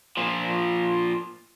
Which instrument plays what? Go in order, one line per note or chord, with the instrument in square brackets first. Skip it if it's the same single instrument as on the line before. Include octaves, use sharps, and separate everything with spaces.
[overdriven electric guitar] A#2 F3